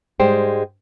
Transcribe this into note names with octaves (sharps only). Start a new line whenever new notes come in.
G#2 G3 G#3 C5 G5